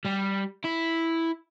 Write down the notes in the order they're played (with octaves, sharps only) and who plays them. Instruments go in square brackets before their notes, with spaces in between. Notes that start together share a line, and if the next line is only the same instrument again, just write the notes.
[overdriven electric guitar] G3
E4